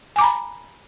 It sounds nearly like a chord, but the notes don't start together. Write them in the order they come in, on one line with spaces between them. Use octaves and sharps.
G#5 D6 A#5 B5